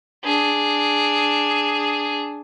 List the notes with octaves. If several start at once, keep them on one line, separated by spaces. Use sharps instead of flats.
D4 G#4